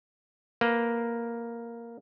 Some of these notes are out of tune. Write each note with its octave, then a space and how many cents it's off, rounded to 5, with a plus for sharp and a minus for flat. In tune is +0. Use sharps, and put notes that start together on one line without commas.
A#3 +0 B4 +0